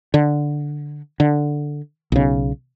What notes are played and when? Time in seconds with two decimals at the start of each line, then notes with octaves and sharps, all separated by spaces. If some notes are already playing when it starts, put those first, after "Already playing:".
0.14 D3
1.20 D3
2.12 B1 C#3